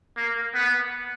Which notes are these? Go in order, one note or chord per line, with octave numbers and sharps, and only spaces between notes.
A#3
B3